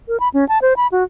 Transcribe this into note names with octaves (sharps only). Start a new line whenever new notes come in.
A#4
B5
C#4
A5
C5
B5
F#4